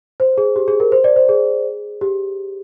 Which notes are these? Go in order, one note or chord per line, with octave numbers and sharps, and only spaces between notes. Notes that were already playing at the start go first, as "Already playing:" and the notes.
C5
G#4
G4
G#4
A#4
C5
D5
C5
G#4
G4